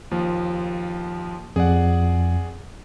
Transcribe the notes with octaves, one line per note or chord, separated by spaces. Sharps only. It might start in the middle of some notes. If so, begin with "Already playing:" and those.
D#2 F3
F2 G#4 D5 F#5